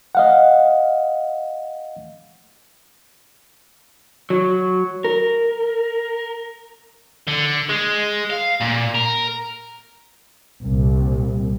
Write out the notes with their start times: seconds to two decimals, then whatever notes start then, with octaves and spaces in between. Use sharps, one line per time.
0.15 D#5 F5 F#5
4.30 F#3
5.05 A#4
7.28 D3
7.69 G#3
8.30 F5
8.62 A#2
8.95 A#4
10.63 C2 A#2